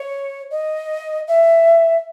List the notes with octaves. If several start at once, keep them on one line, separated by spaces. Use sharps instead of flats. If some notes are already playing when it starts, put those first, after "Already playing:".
Already playing: C#5
D#5
E5